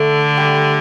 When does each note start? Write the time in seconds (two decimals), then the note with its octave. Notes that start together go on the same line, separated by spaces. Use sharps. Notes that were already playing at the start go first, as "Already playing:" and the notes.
Already playing: D3 A3 A4
0.37 G3 G4